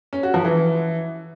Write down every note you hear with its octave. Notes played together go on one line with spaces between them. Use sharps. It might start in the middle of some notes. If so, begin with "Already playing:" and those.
C#4
F#4
F3
E3